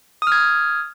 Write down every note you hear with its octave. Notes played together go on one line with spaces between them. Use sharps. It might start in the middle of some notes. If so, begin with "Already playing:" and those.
D#6 F6 G#6